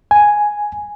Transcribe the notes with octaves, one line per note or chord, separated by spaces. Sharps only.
G#5